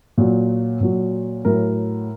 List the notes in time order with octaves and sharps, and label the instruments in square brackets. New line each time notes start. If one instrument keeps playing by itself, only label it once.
[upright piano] A#2 F#3
A#2 F#3
A2 F#3 A#4